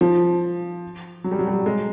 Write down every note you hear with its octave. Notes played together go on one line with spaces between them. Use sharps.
F3
F#3
G3
F#3
G3
F#3
G#3